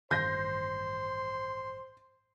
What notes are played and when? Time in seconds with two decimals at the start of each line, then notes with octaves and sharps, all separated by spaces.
0.11 A1 G2 D#3 C5 C6 G6 A#6